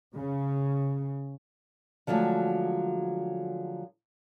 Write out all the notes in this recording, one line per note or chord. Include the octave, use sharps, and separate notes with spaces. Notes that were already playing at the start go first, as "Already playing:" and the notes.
C#3
D3 F3 F#3 G#3 A3